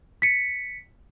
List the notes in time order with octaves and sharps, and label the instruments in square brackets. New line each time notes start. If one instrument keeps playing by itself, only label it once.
[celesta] B6 C#7